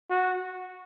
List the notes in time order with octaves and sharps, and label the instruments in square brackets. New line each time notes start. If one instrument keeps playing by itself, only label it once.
[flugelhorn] F#4